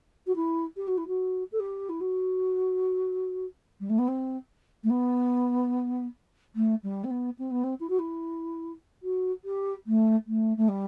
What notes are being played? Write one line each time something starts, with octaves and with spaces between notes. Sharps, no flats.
F#4
E4
G4
F#4
E4
F#4
A4
G4
E4
F#4
G3
A3
B3
C4
A3
B3
A3
G3
C4
B3
C4
B3
C4
E4
F#4
E4
F#4
G4
A3
A3
A3
G3